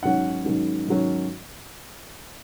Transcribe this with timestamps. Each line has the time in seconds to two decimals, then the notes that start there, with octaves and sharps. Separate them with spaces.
0.03 G#2 D#3 F#3 C#4 F#5
0.45 G#2 D#3 F#3 C#4
0.87 G#2 D#3 F#3 C#4